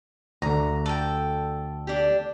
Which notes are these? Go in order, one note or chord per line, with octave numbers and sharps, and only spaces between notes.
D2 D3 A#5
A4 G5
D4 G4